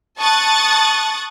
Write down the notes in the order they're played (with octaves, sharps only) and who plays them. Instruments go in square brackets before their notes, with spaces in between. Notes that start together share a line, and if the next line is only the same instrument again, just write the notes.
[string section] A5 C#6 D#6 F#6 A6